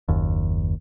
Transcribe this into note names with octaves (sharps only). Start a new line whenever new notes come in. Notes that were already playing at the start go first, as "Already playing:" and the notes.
F#1 D#2